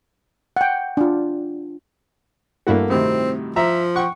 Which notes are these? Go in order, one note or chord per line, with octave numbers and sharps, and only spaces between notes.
F#5 G5
D4 F4
G2 A3 A#3 E4 F#4
A2 C3 D#3 C4
F3 E5 A#5
F#5 G5 C#6